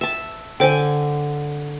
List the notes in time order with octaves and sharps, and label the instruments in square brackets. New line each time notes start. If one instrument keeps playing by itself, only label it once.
[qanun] E5 A5
[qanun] D3 G#5 [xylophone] A4 C5 G5